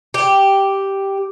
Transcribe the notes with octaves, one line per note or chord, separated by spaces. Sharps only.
G4